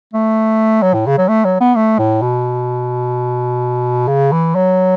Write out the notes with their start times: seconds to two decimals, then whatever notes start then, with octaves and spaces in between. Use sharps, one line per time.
0.14 A3
0.83 F#3
0.94 A2
1.07 C#3
1.18 F#3
1.29 A3
1.45 F#3
1.60 B3
1.76 A3
1.99 A2
2.22 B2
4.08 C#3
4.32 E3
4.55 F#3